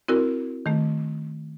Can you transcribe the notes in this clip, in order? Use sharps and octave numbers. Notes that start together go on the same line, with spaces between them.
C4 E4 F#4 A#4
D#3 A3